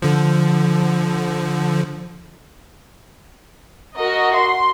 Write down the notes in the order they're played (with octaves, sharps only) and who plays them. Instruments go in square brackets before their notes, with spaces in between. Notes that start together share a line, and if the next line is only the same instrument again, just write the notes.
[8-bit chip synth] D3 F3
[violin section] F#4 A#4 D#5
C6